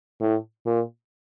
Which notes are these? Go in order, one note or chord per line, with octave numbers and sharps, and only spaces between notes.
A2
A#2